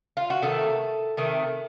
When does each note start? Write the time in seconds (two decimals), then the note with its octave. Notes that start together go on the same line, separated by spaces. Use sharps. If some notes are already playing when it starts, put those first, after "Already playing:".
0.17 F4
0.30 F#4
0.42 C3 D#3 A3 A4
1.17 C3 D#3 A3